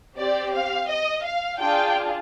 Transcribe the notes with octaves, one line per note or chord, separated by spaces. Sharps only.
C4 G4 D5
F5
D#5
F5
D4 F4 G#4 G5